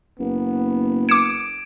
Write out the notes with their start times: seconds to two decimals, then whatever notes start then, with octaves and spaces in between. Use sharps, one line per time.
0.19 F#1 B3
1.09 D6 G#6 C#7 D7 E7